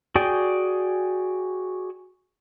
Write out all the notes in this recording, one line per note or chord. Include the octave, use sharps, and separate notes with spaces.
F#4 G#4 D5 G5 G#5